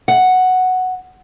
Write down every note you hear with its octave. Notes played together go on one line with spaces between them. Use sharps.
F#5